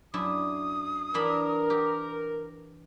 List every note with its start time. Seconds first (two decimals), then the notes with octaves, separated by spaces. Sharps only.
0.14 F#2 D4 E4 D#6
1.14 E3 D4 A#4 B5
1.70 G4